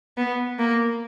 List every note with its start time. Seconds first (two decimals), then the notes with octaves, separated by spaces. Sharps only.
0.17 B3
0.59 A#3